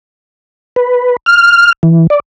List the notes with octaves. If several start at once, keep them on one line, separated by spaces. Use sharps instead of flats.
B4
F6
E3
D5